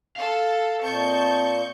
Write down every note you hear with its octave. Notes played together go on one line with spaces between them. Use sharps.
A4 F5
A#2 C4 D#5 A5 C#6 G6